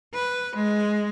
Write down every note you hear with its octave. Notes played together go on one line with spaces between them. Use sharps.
B4
G#3